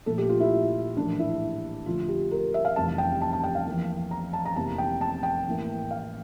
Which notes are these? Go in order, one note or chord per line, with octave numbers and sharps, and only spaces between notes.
A#1 A#2 A3 A4
G4
F4
E4
A#1 A2 E3 A#3 D4
E4
F2 D3 A3 F4
G4
A#4
E5
F5
F1 F2 C3 E3 G3 A5
G5
A5
A5
G5
F5
F2 E3 A#3
A#5
A5
A#5
F1 E2 C3 E3 A#3 A5
G5
A5
G5
A1 A2 E3 A#3
F5